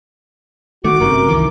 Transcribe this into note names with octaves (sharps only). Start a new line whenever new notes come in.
D#3 A3 F#4 D6
G1 F#2 C3 A#4
C2 D#3 E3